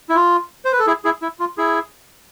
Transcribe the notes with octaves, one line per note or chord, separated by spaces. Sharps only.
E4
F4
C5
B4
A4
E4 G#4
E4 G#4
E4
F4
E4 G#4